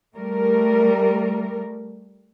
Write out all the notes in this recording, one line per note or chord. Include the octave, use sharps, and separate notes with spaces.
G3 A3 A#4